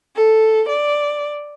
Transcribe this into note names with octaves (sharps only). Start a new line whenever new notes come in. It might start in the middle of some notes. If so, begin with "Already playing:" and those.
A4
D5